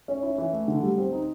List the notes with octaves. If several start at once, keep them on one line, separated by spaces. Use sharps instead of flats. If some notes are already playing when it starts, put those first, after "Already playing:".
C#4
E4
E3
A3
D3
G3
C4
D#4